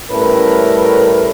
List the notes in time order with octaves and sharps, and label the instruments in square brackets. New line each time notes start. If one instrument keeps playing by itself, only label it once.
[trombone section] A2 G3 C#4 A#4 B4